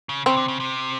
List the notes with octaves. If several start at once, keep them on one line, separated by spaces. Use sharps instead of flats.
C#3
C#3 C4
D3
C#3
C3